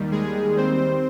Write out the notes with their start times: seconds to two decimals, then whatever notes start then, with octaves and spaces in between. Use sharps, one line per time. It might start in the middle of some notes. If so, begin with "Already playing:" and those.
Already playing: D#2 D#3 G3
0.11 G#3 G#4
0.57 C4 C5